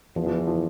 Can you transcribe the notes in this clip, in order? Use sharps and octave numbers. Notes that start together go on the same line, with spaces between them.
E2 F3
F3
E3
F3